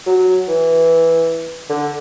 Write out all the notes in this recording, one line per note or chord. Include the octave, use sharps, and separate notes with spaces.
F#3
E3
D3